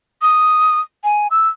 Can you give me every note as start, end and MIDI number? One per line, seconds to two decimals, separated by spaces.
0.22 0.80 87
1.04 1.28 80
1.31 1.48 88